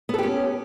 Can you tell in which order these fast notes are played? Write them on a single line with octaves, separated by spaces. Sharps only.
B3 A4 G4 C#4